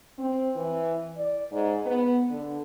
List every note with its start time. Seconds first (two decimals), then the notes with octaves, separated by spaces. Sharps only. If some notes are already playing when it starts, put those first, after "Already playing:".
0.18 C4
0.56 E3
1.17 D5
1.52 G#2
1.86 B3
2.30 D3